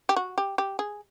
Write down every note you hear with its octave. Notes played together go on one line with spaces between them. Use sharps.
G4
F#4
G4
G4
G#4